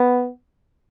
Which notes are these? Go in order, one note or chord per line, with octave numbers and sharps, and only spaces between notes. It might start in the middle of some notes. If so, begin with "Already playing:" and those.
Already playing: B3